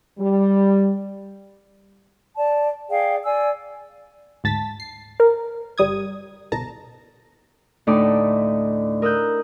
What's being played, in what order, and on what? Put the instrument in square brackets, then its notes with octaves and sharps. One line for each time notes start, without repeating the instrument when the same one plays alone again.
[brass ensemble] G3
[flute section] D5 A5
G#4 D5 F5 G5
D5 G#5 E6
[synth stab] D2 G#2 A5 A6 B6
C7
A#4
G1 G3 D#6 G#6
G1 C2 B2 A5 A#5
[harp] D2 A2 D#4 A4 D5 D#6
A#4 D#6 E6 F#6 G6